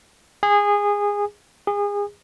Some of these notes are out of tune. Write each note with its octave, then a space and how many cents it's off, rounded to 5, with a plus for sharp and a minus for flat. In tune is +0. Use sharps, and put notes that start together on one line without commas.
G#4 -20
G#4 -30